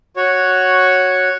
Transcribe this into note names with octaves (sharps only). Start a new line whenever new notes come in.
F#4 C#5